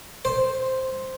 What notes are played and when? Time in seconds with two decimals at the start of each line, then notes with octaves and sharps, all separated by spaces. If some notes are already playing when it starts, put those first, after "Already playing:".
0.25 C5